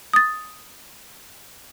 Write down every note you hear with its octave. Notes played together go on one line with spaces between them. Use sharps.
D#6 A6